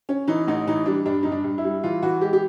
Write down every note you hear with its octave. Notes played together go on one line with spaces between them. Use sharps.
C#4
E3 D#4
A1 D#4
E3 D#4
G3 D4
G2 D4
G2 D#4
D4
G2
E4
G3
E3 F4
E3 F#4
G#3 G4
G4